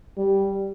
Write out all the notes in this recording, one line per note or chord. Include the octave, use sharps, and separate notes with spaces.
G3